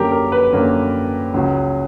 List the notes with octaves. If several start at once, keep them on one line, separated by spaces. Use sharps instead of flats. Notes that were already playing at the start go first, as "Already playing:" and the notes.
Already playing: F#2 D3 A#3 C#4 G4 A#4
A#4
B4
F#2 D3 A#3 C#4
C#2 C#3 F#3 C#4